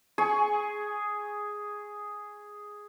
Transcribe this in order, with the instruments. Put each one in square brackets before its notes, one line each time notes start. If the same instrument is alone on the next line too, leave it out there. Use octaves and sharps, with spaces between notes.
[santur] G#4 G#5 C#6